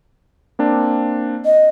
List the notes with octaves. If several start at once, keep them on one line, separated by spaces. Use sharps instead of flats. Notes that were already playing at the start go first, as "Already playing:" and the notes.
A#3 C4 D4
D#5